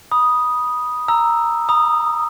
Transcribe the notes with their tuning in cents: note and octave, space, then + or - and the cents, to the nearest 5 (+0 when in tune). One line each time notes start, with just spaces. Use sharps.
B5 -20 D#6 +0
A#5 +0 E6 +0
B5 -45 D#6 -10